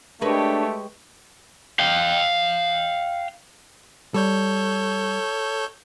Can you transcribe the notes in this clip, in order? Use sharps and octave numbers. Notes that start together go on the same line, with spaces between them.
G#3 A3 D4 G4 A#4 B4 C#5
F5 G5
G3 A4 C#5 G6